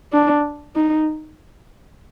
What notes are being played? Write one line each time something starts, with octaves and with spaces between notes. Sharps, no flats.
D4
D#4